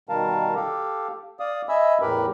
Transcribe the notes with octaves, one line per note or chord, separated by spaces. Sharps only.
B2 D#3 G3 A#4 F5 A5
G4 A4 F5
D5 F5 D#6
D#5 E5 G#5 B5 E6
E2 A2 G4 A#4 B4 B5